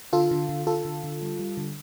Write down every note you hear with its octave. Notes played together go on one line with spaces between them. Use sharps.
D3 F4 A4
D3
D3
D3 F4 A4
D3
D3
G3
G3
D3